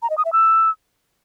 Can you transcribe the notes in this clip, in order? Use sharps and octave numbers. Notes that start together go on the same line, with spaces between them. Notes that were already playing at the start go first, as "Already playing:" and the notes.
A#5
D#5
D#6
E5
E6